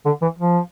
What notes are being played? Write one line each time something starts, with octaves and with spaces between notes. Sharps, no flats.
D3
E3
F3